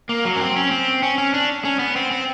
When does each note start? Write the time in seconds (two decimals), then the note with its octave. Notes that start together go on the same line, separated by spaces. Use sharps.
0.09 A#3
0.25 F#3
0.36 C#4
0.41 C4
0.56 C#4
0.71 C4
1.03 C#4
1.18 C#4
1.34 D4
1.65 C#4
1.79 B3
1.96 C4
2.11 C4